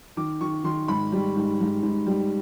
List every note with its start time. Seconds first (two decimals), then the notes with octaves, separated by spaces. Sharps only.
0.17 D#3 D6
0.41 D#3 C#6
0.64 D#3 C6
0.88 G#2 B5
1.12 G3
1.36 G#2
1.60 G#2
1.83 G#2
2.07 G3